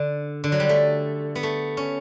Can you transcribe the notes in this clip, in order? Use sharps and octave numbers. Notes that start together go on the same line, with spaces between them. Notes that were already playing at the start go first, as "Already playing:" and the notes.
Already playing: D3
D3
F#3
G3
A3
B3
A3
C#4